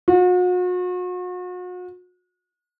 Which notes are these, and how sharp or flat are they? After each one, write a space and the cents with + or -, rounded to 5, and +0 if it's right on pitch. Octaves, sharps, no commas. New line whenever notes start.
F#4 -40